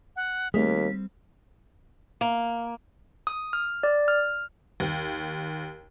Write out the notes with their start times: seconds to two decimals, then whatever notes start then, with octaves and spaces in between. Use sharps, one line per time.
0.16 F#5
0.54 D#2 G3 A3 C4 G#4 B6
2.21 A#3
3.27 D#6
3.53 F6
3.83 D5
4.08 F6
4.80 D#2